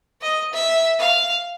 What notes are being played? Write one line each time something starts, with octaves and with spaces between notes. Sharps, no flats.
D#5
E5
F5